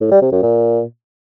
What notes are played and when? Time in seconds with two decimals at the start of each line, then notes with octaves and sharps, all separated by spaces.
0.01 A2
0.11 G3
0.22 C3
0.32 F#2
0.42 A#2